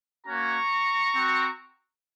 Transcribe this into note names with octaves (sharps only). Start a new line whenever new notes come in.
A#3 C#4 F#4 A#5 C#6
C4 F#4